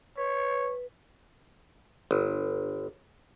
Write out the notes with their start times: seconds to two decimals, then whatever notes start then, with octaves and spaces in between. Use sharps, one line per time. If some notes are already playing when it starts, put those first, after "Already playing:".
0.17 B4 C#5
2.11 G1